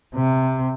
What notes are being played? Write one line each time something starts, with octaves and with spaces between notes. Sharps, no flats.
C3